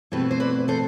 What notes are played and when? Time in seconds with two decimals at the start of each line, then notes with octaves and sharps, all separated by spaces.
0.12 B2 A3 C4 E4 G4 B4
0.31 C5
0.40 B4 D5
0.68 A4 C5